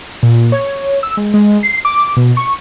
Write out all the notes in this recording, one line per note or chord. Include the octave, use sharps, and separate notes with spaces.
A#2
C#5
E6
G#3
G#3
C7
D6
B2
C#6